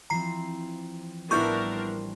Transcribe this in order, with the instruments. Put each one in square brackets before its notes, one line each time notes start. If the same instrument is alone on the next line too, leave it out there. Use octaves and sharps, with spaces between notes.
[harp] E3 F3 C4 [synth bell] A#5 C7
[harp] A1 G3 [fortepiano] B3 E4 [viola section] D4 A#4 [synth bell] C#6 G6
[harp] C5